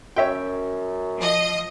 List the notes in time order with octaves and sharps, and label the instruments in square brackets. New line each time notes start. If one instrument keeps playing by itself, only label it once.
[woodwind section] F#2 [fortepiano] C#5 E5 G5
[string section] F3 D#5